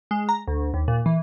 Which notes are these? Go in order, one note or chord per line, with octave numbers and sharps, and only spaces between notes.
G#3
A#5
D2
D#2
A#2
E3